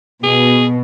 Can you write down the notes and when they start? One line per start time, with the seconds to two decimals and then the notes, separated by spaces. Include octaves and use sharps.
0.24 B2 G#4